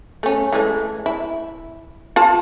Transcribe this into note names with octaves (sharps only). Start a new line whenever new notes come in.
A3 C#4
E3 G#3 A3
E4
F4 F5 A5